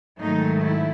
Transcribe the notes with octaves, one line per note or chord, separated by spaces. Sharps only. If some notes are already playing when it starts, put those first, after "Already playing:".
G#2 D#3 F#3 A3 D#4
E4